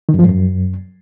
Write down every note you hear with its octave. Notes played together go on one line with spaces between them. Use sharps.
D#3
F#2
F3
G#2
F#2